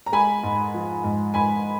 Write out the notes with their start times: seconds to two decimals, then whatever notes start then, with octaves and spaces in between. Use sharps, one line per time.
0.06 A#5
0.12 G#3 G#5 B5
0.43 G#2
0.74 F3
1.04 G#2
1.34 G#2 G#5 B5